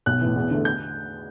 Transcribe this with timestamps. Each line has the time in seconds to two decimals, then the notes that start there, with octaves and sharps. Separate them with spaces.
0.06 B1 F#6
0.21 A2 E3
0.36 E2
0.50 D3 A3
0.65 G6